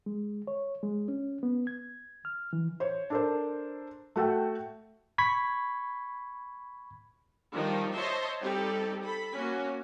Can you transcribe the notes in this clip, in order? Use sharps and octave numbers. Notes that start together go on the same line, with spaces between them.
G#3
C#5
G#3
C#4
B3
G#6
F6
E3
C5 C#5
D4 A4 A#4 C5
A3 F#4 A4 G5
B5 C#6 G#6 B6
D#3 F3 G3 D#4 F4
C5 C#5 D#5 E5 A5 C6
G3 C4 D#4 G4 A4
A4 B5
A#3 C#4 F#4